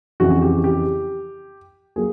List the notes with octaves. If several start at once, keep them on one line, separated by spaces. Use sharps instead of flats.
F2 C#3 E3 F#4
G4
G4
F#3 A#3 G#4